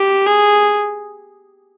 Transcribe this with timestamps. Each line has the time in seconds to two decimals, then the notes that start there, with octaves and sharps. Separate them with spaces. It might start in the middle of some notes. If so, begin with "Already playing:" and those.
Already playing: G4
0.26 G#4